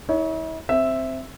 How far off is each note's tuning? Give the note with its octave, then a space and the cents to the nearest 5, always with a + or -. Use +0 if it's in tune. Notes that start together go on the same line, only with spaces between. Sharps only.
E4 -45 C#5 +20
C4 +0 E5 +0